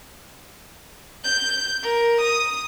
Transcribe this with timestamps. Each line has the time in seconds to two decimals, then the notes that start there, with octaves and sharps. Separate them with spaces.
1.24 G6
1.83 A#4
2.21 D#6